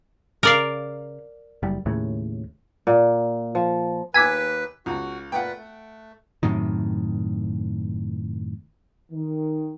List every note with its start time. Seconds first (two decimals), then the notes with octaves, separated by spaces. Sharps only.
0.43 C#3 A#4 D5 F5
1.63 F#1 G3
1.86 D#2 A2 C#3
2.87 A#2
3.55 F3
4.14 D#2 B4 G#5 D6 E6 B6
4.86 C#2 F#4
5.32 A#2 A3 B4 F#5 G5
5.57 A3
6.43 F#2 A2 C3 D#3
9.12 D#3